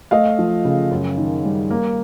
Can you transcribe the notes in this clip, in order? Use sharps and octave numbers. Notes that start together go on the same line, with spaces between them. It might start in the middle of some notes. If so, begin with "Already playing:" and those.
A3 D#5 F5
F3
C#3
F#2
D#3
G3
A#3